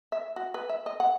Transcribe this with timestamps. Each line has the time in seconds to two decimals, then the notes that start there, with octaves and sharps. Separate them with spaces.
0.12 E5
0.36 F#4
0.54 B4
0.69 E5
0.86 D#5
1.00 F#5